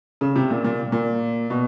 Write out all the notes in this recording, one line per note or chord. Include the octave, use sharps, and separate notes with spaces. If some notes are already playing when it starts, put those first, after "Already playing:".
C#3
C3
A#2
A#2
A#2
B2